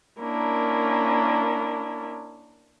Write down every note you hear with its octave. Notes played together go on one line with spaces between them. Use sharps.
A#3 C#4 D4 E4 A#4